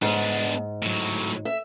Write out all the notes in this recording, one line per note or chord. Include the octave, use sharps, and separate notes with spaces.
G#2 B3 D4
A2 F#3
E5